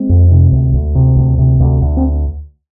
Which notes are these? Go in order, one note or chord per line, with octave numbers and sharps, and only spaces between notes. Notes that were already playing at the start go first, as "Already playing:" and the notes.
Already playing: G#3 C4
F2
C3
D2
D2
C3
D2
C3
D2
D2
C4